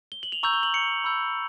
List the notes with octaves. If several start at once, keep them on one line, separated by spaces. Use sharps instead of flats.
G7
F#7
F7
A#5 C#6 E6 G6 F7
G7
F#7
C#7
B5 E6 G6